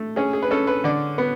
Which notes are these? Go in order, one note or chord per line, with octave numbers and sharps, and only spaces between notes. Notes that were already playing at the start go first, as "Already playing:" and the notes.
Already playing: A3
C#4 G#4
G#4
B4
C#4 A4
B4
D3 D5
B3